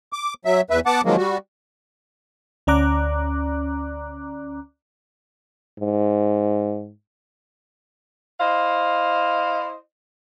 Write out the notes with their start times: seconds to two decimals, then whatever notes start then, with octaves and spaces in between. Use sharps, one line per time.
0.13 D6
0.45 F#3 E5
0.70 E2 B4 E5
0.86 B3 F#5 A5 D6
1.05 D#3 F3 F#3 G#3 A#3
1.17 G3 F#4
2.67 D2 C#4 D5 A#5 D6 F#6
5.80 G#2
8.40 E4 C5 D#5 F5